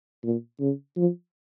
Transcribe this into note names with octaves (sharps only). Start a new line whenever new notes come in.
A#2
C#3
F3